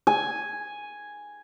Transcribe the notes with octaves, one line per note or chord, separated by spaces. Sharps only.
G#5